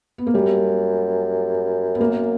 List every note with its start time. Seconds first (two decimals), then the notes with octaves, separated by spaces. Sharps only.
0.18 B3
0.27 A#3
0.34 F#2 G3
1.95 B3
2.01 A#3